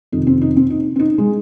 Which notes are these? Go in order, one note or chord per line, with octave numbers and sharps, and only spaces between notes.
F2 C3 D#3 D#4
C4
D#4
C4
D#4
C4
D#4
G#3